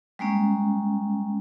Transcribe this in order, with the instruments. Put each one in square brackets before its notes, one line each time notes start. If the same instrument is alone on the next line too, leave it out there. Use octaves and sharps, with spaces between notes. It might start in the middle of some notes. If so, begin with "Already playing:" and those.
[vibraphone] G3 G#3 A#3 C#4